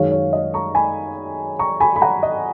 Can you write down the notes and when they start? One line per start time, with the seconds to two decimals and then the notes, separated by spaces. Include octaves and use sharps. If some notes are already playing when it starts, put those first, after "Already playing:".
Already playing: F#2 D#3 G#3 C#4 C#5 F5
0.12 C#5
0.33 D#5
0.54 A#5 C#6
0.75 G#5 B5
1.59 A#5 C#6
1.80 G#5 B5
1.96 B5
2.01 F#5 A#5
2.23 D#5